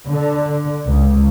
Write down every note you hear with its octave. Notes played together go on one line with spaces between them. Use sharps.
D3
C#2